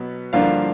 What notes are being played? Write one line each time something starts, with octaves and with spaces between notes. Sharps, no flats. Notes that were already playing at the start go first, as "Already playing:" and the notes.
Already playing: B2 F#3 B3
G2 D3 F3 A#3 D4 F4 F5